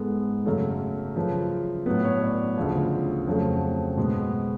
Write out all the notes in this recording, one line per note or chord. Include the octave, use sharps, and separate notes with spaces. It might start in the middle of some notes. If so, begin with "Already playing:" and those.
Already playing: G#2 G#3 B3 A4
F#2 C#3 F#3 A3 A4
F#2 C#3 F3 B4
A2 F#3 B3 B4
C#5
D5
D2 C#3 F3
F2 C#3 F#3 A3
B2 G#3 B3 G#4